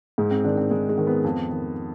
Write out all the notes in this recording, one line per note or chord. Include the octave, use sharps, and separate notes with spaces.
G#2 G#3
C4
D#3 D4
C4
G#2 G#3
G#3
D#3
B3
F2
D#3